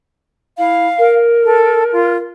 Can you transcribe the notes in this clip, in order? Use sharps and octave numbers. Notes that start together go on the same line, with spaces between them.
E4 F5
A#4
A4
F4